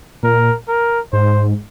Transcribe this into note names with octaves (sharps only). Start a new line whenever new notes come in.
A#2 A#4
A#4
G#2 C5